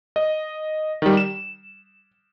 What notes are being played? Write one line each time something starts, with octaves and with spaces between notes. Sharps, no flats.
D#5
D#3 G3
E7